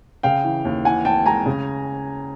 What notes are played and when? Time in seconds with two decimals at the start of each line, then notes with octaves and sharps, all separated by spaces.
0.23 C#3 F5 G5
0.44 E3
0.65 D#2
0.85 E3 F#5 G#5
1.05 E3 G5 A5
1.25 G#3 G#5 A#5
1.46 C#3